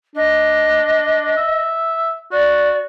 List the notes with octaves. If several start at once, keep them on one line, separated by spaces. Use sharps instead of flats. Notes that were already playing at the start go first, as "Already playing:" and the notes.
D4 D#5
E5
F#4 D5